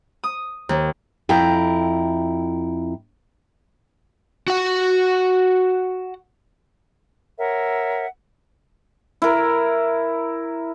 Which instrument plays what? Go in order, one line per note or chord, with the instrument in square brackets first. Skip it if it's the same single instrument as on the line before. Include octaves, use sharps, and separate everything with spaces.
[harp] D#6
D#2
[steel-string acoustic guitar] F2 E4 G5 A#5
[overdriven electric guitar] F#4 F#5
[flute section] A#4 C#5 E5 F#5
[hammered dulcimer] E4 A#4